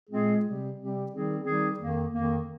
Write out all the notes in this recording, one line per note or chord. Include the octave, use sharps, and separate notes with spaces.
A#2 G#3 C4 F4 G#4
C3 G3 C4 G4
C3 G3 C4 G4
D#3 G3 C4 D#4 G#4
D#3 G3 C4 D#4 G#4
F2 D#3 A#3
F2 D#3 A#3